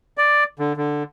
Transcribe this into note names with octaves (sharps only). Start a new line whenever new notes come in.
D5
D3
D3